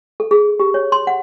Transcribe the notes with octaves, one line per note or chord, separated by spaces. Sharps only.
A4
G#4
G4
C#5
C6
F#5